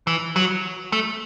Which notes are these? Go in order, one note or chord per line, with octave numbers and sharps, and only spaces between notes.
E3
F#3
A3